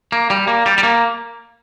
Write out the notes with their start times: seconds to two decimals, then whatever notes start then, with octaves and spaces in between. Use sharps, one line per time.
0.12 A#3
0.30 G3
0.47 A#3
0.66 G3
0.78 G3
0.83 A#3